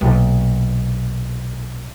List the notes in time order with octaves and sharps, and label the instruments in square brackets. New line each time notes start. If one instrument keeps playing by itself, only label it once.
[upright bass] B1 A#2